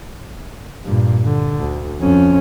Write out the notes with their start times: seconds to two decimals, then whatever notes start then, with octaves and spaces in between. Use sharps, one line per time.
0.85 G2 A#2
1.25 D3
1.59 D2
2.01 F2 C#4